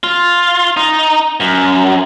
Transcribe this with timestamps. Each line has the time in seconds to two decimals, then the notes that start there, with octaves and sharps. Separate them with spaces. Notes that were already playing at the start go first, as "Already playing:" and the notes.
0.03 F4
0.77 D#4
1.40 F#2